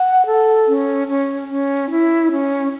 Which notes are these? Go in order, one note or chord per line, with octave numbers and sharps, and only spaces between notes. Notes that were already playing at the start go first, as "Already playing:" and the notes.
Already playing: F#5
A4
C#4
C#4
C#4
E4
C#4